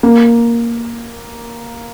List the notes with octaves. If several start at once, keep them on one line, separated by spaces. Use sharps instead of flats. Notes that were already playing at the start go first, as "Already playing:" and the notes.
A#3